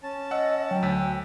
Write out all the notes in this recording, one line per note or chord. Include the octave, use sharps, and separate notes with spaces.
C#4 A5
D#5 F#5 E6
F#3 G5
D2 E6 B6